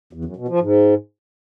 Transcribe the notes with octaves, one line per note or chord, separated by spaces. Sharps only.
E2
F#2
B2
F3
G#2